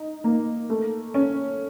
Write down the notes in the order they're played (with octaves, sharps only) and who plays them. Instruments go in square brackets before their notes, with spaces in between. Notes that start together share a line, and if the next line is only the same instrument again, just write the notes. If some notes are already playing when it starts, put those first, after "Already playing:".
Already playing: [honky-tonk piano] D#4
A#3
A3
C#4